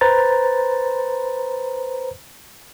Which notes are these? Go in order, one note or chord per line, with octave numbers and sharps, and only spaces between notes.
B4 C5 A#5 A6